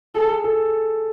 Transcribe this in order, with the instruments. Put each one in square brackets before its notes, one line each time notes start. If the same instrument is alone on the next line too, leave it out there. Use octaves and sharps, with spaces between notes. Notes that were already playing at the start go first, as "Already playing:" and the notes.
[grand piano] G#4 [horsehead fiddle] A4
[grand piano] A4